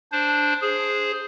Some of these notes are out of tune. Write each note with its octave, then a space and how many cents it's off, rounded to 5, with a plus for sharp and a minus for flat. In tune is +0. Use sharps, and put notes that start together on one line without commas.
D4 -5 C5 +0
G#4 +0 C5 +0